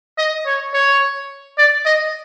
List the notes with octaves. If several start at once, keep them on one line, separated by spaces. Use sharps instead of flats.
D#5
C#5
C#5
D5
D#5